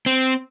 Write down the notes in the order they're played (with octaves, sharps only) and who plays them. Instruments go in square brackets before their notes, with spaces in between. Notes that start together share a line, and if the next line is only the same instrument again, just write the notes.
[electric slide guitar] C4